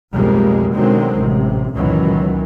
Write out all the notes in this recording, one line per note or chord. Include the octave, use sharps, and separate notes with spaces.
B1 F2 A2 G3 G#3 A#3
B2 D3 D#3 F#3 G#3 C4
A1 C3
C#2 F#2 A#2 D#3 E3 F#3